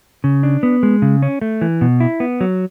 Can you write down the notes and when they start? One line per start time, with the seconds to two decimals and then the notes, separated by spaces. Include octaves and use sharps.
0.24 C#3
0.43 D4
0.63 B3
0.83 G#3
1.02 C#3
1.23 C#4
1.42 A3
1.61 E3
1.81 B2
2.00 E4
2.20 B3
2.41 F#3